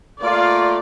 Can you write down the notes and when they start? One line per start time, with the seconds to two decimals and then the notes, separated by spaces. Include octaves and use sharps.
0.23 A3 A#3 F4 D5